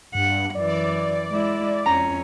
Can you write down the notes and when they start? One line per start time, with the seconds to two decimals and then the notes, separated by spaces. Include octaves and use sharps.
0.15 G2 F#5
0.55 F#2 E3 D5
1.30 G#3 E4
1.86 F2 C#4 A#5